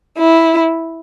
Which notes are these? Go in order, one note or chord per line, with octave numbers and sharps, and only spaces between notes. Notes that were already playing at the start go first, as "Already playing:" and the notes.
E4